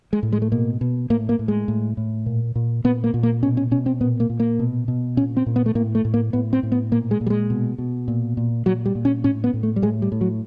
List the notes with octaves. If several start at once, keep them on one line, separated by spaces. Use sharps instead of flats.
G#3
A2
G#3
A3
B2 A#3
B2
A2 A#3
A#3
A2
G#3
A2
A2
A#2
A#2
A#2 B3
A#3
A#2
A#3
B2 C#4
C#4
B2 C#4
C4
A#2 B3
A#3
A#2
A#3
B2
B2
A#2 C#4
C4
A#2
B3
A3
A2 A#3
A3
A2
A#3
A2 B3
C4
A2
B3
A#2 A#3
G#3
A#2
G3
G#3
B2
B2
A#2
A#2
A#2 F#3
G3
A#2
C#4
A2 C#4
B3
A2
A3
G3
A2 G#3
G3
A2
F#3